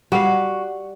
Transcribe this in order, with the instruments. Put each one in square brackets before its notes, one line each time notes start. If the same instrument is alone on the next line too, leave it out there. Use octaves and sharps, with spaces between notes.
[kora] G3 F5 [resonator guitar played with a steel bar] F#4